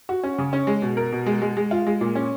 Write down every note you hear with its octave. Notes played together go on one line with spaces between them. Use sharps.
F#4
C#4
C#3
C#4
G#3
B2
A#4
B2
G#3
G#3
G#3
F4
G#3
A#2
C#4